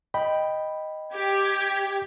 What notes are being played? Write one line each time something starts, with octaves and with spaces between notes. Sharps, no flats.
D#5 G5 B5
G4 G#6